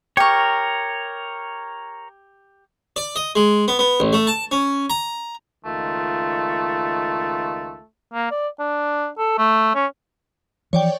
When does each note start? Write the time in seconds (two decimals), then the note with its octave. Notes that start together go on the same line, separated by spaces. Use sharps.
0.17 G4 A#4 C#5 C#6
2.96 D5
3.16 D#5
3.36 G#3
3.68 B3
3.79 B3
4.00 A1
4.13 A3
4.27 A5
4.51 C#4
4.90 A#5
5.65 C#2 D#3 A3 F4
8.14 A#3
8.31 D5
8.59 D4
9.18 A4
9.38 A3
9.75 C#4
10.73 E3 F3 C#5 D5 G5